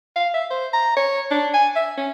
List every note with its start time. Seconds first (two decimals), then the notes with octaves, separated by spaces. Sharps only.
0.16 F5
0.34 E5
0.51 C5
0.73 A#5
0.96 C#5
1.31 D4
1.54 G#5
1.76 E5
1.97 C#4